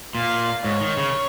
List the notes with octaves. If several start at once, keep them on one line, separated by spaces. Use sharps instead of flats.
A#2 F5
G#2 C#5
D#3
C#3